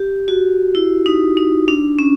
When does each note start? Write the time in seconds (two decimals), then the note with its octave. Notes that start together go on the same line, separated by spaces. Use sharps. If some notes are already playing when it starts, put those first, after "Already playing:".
Already playing: G4
0.28 F#4
0.75 E4
1.06 D#4
1.37 D#4
1.68 D4
1.99 C#4